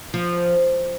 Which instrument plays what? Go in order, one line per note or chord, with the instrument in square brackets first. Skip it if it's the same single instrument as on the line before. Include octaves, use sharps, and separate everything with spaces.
[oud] F3